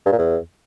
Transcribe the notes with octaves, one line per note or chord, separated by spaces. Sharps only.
G2
A#2
E2